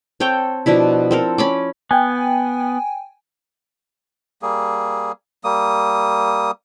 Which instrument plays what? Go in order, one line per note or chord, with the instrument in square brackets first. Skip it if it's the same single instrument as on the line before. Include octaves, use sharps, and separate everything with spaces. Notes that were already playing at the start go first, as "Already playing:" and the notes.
[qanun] C4 A4 C#5 G5
B2 F3 D4 E4
C4 A4 A#4
C#4 B5 D6
[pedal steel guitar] B3 [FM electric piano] G5 G#5
[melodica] G3 A#3 G#4
G3 A#3 D#6